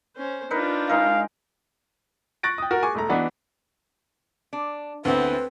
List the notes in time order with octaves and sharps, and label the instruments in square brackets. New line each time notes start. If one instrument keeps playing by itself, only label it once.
[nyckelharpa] C#4 C5
[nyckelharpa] D4 F4 [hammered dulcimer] D#4 A#4 B4
[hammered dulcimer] G#3 D#4 A#4 [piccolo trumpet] F5
[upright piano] C#6 F#6 A6 A#6 D7
G5 D#6
F#4 A#4
G#4 G#5 C#6 D6
E1 A3 A#5
E3 B3 D4 D#4 F#4
[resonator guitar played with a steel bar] D4
[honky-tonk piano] D2 [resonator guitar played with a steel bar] E3 B3 [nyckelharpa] C4 [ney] B4